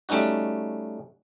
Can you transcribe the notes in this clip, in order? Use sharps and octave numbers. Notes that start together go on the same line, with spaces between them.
G3 A3 C#4 D#4 F#4